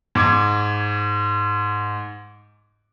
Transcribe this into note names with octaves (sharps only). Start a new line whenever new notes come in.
G#2 D6 G#6